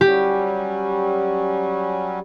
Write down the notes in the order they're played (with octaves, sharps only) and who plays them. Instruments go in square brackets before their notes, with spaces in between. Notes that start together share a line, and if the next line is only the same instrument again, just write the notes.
[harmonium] F#3 G3 C#4 [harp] G4